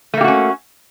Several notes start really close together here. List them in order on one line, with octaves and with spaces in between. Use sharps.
A3 A#3 G4 F#4 C#4